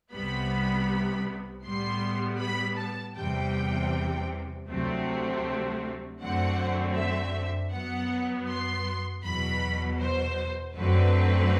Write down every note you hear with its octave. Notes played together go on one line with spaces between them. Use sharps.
C2 C3 G3 B3 B5
A2 G3 B3 C6
B5
A5
E2 C3 E3 G3 G5
D2 C3 F#3 A3 C4
F#2 D3 A3 C4 F#5
E5
F#2 F#3 B3 F#5
C6
E2 B2 F#3 B5
C5
F#2 D3 F#3 A3 C4 B4